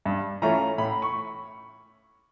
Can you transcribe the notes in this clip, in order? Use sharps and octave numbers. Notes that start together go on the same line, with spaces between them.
G2
E3 A3 C#4 F4 A#5
A2 B5
C#6